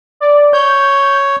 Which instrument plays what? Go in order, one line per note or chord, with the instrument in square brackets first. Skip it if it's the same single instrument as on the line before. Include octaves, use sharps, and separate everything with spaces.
[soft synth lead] D5
[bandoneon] C#5 [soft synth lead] G6